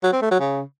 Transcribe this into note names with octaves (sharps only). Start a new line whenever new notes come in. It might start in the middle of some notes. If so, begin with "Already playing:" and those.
F#3
C4
A3
F#3
C#3